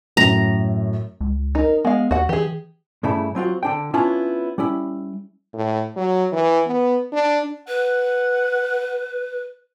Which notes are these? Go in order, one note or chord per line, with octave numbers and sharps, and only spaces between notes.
F#2 A2 A#5
C#2
D#4 A#4
G#3 B3 F5
D#2 F#4 F#5
E3 G4 G#4
G2 C#3 A3 E4
F#3 C4 F4 F#4
D3 D4 G5
B3 C#4 D4 E4 F4 C#5
G3 C#4 E4
A2
F#3
E3
B3
D4
B4 F#5